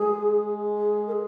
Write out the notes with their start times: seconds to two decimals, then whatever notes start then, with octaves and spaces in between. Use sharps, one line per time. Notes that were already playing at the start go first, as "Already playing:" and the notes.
Already playing: G#3 G#4
0.78 G#4
1.07 A#4
1.12 G#4